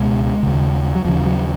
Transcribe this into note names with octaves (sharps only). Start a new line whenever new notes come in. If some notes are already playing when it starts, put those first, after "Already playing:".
Already playing: C#2 B2 G#3
D#2 C#3
F#3
D#2 C#3 F3
F3
F#3